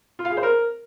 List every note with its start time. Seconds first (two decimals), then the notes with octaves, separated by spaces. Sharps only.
0.19 F4
0.25 F5
0.31 G#4
0.37 C5
0.43 A#4